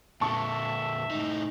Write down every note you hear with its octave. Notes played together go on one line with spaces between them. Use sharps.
A#2 D3 E5 A5 C#6
A2 D#4